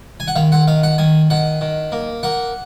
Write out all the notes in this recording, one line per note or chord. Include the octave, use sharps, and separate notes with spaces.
G#5
F#5
D#3 F5
F#5
D#3 F5
F#5
D#3 G#5
D#3 F#5
D#3
A#3
A#3 F#5